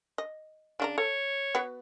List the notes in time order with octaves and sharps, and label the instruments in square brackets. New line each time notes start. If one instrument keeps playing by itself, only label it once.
[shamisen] D#5
[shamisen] C#3 F4 A#5 [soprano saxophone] D4
[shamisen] A4 [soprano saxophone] C#5
[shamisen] B3 F#4 B4